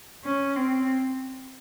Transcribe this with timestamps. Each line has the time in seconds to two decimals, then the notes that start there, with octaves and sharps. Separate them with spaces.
0.24 C#4
0.56 C4